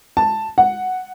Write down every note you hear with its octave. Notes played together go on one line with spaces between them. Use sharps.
A5
F#5